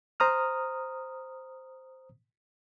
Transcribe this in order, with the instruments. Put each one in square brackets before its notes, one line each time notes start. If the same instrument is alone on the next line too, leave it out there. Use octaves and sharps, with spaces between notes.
[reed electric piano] C5 A#5 D#6 F6